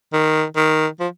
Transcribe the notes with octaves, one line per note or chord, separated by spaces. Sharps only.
D#3
D#3
F3